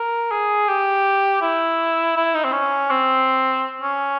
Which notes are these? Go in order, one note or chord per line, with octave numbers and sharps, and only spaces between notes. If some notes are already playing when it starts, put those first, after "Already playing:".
Already playing: A#4
G#4
G4
E4
E4
D#4
C4
C#4
C4
C#4